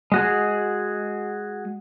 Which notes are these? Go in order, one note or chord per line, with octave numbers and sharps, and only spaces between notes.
G#3 F#4 G#4